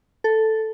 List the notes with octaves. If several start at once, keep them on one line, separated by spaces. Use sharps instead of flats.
A4